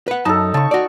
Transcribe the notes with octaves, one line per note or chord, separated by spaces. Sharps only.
B4 F#5
F#2 D#4 A4 A5
C#3 A5 C#6
F#4 D5